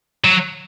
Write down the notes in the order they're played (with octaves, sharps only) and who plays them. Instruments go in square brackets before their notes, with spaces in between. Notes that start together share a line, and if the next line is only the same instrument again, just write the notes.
[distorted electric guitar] F#3